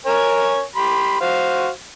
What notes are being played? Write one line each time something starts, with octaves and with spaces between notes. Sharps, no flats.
A#4 C#5 G#5
G4 B5 C6
F#4 C5 F5